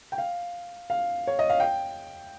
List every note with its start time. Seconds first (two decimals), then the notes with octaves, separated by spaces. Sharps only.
0.12 G5
0.18 F5
0.90 F5
1.27 C#5
1.39 D#5
1.49 F5
1.60 G5